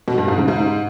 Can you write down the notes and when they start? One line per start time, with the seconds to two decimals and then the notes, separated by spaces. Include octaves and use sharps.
0.08 B2
0.18 G2
0.28 G#2
0.38 C#3
0.48 G#2